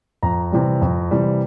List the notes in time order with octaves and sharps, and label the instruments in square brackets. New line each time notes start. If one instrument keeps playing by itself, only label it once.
[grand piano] F2 A#5
C3 E3 G3
F2
C3 E3 G3